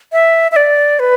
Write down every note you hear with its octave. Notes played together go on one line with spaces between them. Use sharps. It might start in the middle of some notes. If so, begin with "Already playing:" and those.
E5
E5
D5
B4